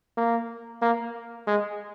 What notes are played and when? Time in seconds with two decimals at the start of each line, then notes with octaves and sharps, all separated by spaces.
0.17 A#3
0.82 A#3
1.47 G#3